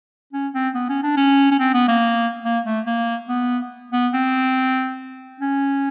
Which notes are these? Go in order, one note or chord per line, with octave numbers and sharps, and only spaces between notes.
C#4
C4
B3
C#4
D4
C#4
C#4
C4
B3
A#3
A#3
A3
A#3
B3
B3
C4
C#4